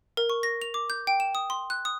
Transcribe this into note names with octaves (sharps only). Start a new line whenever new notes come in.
A#4
C#6
A#6
F7
D6
G6
G5
E7
D#6
C6
F#6
D#6